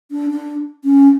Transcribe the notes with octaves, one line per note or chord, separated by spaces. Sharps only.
D4
D4
C#4